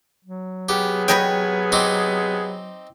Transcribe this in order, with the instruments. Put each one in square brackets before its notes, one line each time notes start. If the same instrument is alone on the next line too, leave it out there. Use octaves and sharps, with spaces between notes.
[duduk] F#3
[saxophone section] C3 B3 G#4 [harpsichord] G4
[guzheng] B4 D#5 G5 [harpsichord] C#5
[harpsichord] C4 D#4 D6